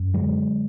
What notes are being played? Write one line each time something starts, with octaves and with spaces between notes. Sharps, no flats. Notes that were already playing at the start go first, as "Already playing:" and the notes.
Already playing: F#2
D3 F#3 G#3